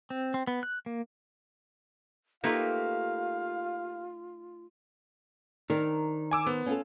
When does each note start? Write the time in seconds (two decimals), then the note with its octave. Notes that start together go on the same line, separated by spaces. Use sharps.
0.10 C4
0.34 C4
0.47 B3
0.63 F#6
0.86 A#3
2.44 A3 A#3 D#4 F4 G4 B4 F5
5.70 D#3 C4 D4 A#4
6.31 G#5 D6 E6
6.47 B3 C5
6.66 C#4 F4 A4